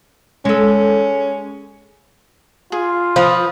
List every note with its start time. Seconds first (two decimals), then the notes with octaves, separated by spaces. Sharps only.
0.45 G#3 C#4 A4
2.72 F4 G#4
3.16 F3 B4 D#6